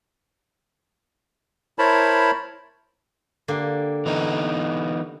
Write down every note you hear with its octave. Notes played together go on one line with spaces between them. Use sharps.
E4 A#4 C5 C#5 A5 B5
D3 A#3 G4
E3 B3 D#4